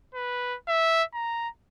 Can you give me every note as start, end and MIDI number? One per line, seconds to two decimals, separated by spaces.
0.15 0.56 71
0.68 1.03 76
1.14 1.48 82